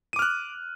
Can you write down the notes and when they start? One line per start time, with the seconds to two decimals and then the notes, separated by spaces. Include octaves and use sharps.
0.13 D#7
0.16 D6
0.19 F6
0.22 F#6